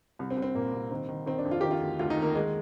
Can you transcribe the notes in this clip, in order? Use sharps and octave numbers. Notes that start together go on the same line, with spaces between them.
C2
C4
C2
C4
A#2 A#3
C2
D#3 C4
D#3
D#3 C4
D4
F2
F4
D#3 G4
F4
D2
D2 F4
D#4
D#3
A#3
D#3 G#3